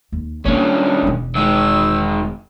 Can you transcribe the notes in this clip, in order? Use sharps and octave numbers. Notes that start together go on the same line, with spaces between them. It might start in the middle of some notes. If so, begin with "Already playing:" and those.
D#2
D#2 A#3 B3 C#4 D4
E1 E2
D#3 G#3 E6